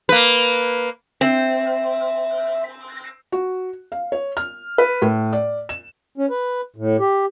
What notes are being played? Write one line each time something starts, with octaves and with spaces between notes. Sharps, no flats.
A#3 B4
C4 E5
F#4
F5
C#5
F6
B4
A2
D5
E7
C#4
B4
A2
G4